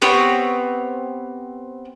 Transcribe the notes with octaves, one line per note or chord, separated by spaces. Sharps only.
B3 C4 G4 C#5